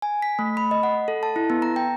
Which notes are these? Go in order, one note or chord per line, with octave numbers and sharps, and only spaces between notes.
G#5
B6
A3
B5
D#5
F#5
A4
A5
E4
B3
A#5
G5